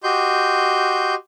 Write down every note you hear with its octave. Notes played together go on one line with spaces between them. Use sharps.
F#4 G4 D#5 C6 G6